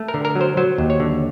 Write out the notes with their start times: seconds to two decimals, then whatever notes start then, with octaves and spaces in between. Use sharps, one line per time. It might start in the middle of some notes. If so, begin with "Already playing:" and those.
Already playing: A3
0.08 A#4
0.14 D3
0.25 A#4
0.35 F#3
0.41 C5
0.57 F#3 C5
0.78 D#2
0.90 C#5
1.00 D3